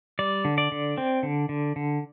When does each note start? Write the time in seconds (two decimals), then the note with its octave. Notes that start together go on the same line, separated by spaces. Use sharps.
0.19 G3 D5
0.45 D3
0.58 D5
0.72 D3
0.98 C4
1.23 D3
1.49 D3
1.76 D3